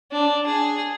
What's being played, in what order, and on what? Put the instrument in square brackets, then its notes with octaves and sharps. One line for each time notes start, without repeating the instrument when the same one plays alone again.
[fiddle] D4
G#4